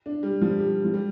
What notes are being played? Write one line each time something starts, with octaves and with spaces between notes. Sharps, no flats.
D4
G3
F3
G3
F3
G3